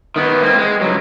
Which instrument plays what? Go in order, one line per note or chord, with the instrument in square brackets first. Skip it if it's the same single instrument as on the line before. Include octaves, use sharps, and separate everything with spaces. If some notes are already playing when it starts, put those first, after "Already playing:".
[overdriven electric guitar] D#3 B3
A#3 C4
G#3
C#2 F#3